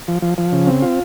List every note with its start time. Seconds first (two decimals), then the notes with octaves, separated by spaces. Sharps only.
0.08 F3
0.22 F3
0.38 F3
0.52 C#3
0.67 C4
0.82 F4